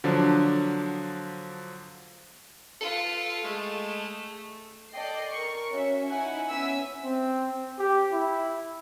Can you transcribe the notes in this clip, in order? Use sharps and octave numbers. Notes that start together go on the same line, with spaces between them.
D3 F3 F#3 D4
F4 A4 B4
G#3 A3
A4 D5 D#5 G5 C7
A#4 C#6
C#4 F#4 E5
D#4 E4 E5 F#5 G#5
B3 C#4 E5 G#5 E6 B6
C4
G4
E4